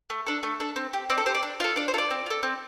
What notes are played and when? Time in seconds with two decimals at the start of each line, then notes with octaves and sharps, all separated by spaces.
0.10 A3
0.26 D4 A4
0.43 A3
0.60 D4 A4
0.76 C4
0.93 G4
1.10 C4 D5
1.18 A4
1.26 G4 C5
1.35 D5
1.43 D4
1.60 F4 A4 F5
1.76 D4 D5
1.88 C5
1.94 F4 A4
1.98 D5
2.11 C4
2.26 F4
2.30 A4
2.43 C4